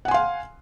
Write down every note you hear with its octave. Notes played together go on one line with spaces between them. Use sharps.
F5 F#5 G#5 C6